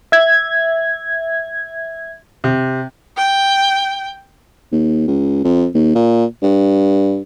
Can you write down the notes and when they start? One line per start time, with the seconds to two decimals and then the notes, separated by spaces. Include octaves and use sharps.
0.12 E5 G#6
2.44 C3
3.17 G5
4.72 D#2
5.07 C#2
5.44 F2
5.74 D#2
5.95 A#2
6.43 G2